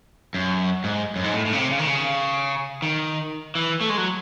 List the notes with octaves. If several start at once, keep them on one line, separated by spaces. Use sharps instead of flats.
F#2
G#2
F#2
G#2
A2
A2
C#3
C3
C#3
D#3
C#3
D#3
E3
A3
G#3
F#3